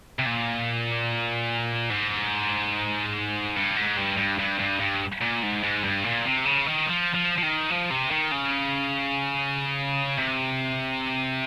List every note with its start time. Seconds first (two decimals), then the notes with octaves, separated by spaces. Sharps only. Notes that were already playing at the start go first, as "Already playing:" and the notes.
0.19 C3
0.26 A#2
1.90 G#2
3.56 G2
3.77 G#2
3.97 G2
4.18 G2
4.39 G2
4.59 G2
4.80 G2
5.21 A#2
5.43 G#2
5.63 G#2
5.84 G2
6.04 A#2
6.25 C3
6.46 C#3
6.67 D#3
6.87 F3
7.14 F3
7.38 F3
7.43 D#3
7.70 F3
7.90 C3
8.11 D#3
8.32 C#3
10.18 C3